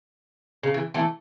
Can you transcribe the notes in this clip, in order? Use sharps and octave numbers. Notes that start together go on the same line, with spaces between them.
C#3
E3
E3 A3